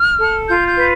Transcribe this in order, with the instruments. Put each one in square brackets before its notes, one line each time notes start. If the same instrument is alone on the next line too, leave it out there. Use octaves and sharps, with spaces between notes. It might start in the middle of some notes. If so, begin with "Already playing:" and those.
Already playing: [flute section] F6
A4
F4 G6
G6
B4